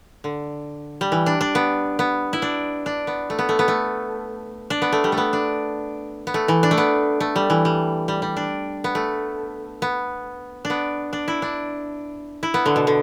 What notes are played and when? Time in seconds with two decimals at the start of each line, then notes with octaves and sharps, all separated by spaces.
0.24 D3
1.01 G3
1.12 E3
1.26 D4
1.41 D4
1.55 B3
1.99 B3
2.33 E4
2.42 D4
2.86 D4
3.07 B3
3.30 A3
3.39 B3
3.49 A3
3.59 B3
3.68 A3
4.70 D4
4.82 B3
4.92 A3
5.04 G3
5.12 A3
5.17 B3
5.33 D4
6.27 B3
6.34 A3
6.48 E3
6.63 D4
6.71 A3
6.78 B3
7.20 A3
7.36 G3
7.50 E3
7.65 G3
8.08 G3
8.22 G3
8.36 D4
8.84 B3
8.95 A3
9.82 B3
10.65 D4
10.70 B3
11.13 D4
11.28 E4
11.42 D4
12.43 E4
12.54 B3
12.66 D3
12.76 B2
12.87 D3